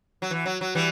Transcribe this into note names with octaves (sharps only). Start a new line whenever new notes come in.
F#3
E3
F#3
F#3
E3 G3